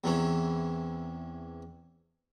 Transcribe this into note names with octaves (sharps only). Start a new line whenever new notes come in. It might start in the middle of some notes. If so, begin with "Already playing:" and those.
E2 C3 E3 C#4